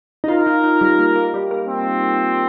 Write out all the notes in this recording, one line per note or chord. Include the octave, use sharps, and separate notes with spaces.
D#4
F4 A#4
D#4
D#4
G3
A#3
A#3
G3
A#3
C4